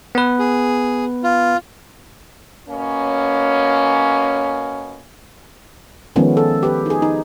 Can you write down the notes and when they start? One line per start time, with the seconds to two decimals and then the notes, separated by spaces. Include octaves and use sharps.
0.15 B3 B4
0.39 G#4
1.24 F4
2.69 B2 A#3 C#4
6.16 D#3 F3 G#3 B3 C#4
6.37 A4
6.63 G4 B4
6.86 D#4 G#4
7.02 D#4